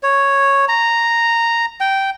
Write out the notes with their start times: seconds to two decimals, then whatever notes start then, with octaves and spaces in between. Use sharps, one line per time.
0.03 C#5
0.68 A#5
1.81 G5